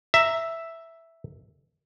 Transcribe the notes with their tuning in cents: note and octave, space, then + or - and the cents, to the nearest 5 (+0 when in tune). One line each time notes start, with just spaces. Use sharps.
E5 +0 A#5 +0